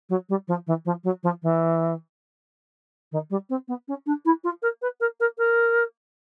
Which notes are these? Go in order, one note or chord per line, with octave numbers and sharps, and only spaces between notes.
F#3
G3
F3
E3
F3
F#3
F3
E3
D#3
G3
C4
B3
C#4
D4
E4
F4
A#4
B4
A#4
A#4
A#4